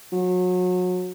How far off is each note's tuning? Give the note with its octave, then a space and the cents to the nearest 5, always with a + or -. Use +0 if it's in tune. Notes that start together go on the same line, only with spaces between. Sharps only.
F#3 -30